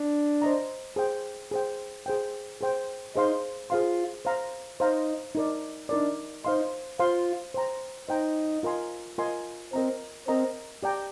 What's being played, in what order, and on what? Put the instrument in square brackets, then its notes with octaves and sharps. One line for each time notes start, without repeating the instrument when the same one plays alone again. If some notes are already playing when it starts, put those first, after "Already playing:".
Already playing: [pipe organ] D4
[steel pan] C5 D#5 A#5
G#4 C5 G5
G#4 C5 G5
G#4 C5 G5
G#4 C5 G5
[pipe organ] D#4 [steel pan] G#4 C5 F5 C6
[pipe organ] F4 [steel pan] G#4 C5 F5 C6
[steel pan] C5 F5 A#5
[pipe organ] D#4 [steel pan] C5 F5 A#5
[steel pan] D#4 A#4 D5
[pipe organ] D4 [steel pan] D#4 A#4 D5
[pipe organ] D#4 [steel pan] C5 F5 C6
[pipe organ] F4 [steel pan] C5 F5 C6
[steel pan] C5 G5 A#5
[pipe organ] D#4 [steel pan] C5 G5 A#5
[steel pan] F4 A#4 D#5 G#5 C6
F4 A#4 D#5 G#5 C6
[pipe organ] C4 [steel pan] A#4 D#5 A#5
[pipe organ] C4 [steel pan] A#4 D#5 A#5
[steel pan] G4 D5 G5 A#5